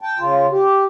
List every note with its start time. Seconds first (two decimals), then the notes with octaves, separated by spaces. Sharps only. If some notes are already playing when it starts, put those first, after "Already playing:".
0.01 G5 A5
0.19 C#3 F4
0.51 G4